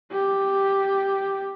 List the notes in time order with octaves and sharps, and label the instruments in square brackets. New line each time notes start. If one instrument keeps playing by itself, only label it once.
[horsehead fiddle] G4